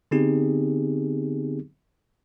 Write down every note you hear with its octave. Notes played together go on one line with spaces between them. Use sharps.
D3 B3 C4 D#4 G4 G#4